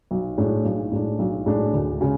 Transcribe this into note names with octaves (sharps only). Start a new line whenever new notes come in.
B1
A2 G#3 D4
B1
A2 G#3 D4
B1
A2 G#3 D4
D2
C#3 G#3